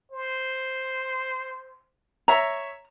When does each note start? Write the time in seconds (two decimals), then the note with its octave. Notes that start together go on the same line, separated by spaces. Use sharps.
0.12 C5
2.28 C#5 E5 A#5